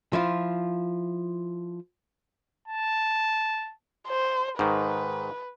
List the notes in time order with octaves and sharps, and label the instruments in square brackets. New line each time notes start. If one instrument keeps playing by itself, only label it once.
[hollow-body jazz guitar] F3 E4 F4
[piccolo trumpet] A5
[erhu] C5
[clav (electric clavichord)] G#2 D#3 [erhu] B4